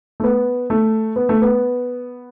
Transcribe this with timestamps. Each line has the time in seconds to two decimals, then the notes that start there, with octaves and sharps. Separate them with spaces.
0.20 A3
0.24 B3
0.70 A3
1.16 B3
1.29 A3
1.42 B3